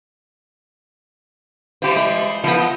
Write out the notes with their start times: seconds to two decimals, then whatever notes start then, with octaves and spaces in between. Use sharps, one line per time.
1.82 E3 F3 G3 G4 C5
1.96 G#3
2.44 F2 F3 G3 B3 E4
2.59 D#5